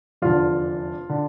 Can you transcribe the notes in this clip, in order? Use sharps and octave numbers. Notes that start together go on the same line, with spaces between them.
F1 E2 D3 F4
D3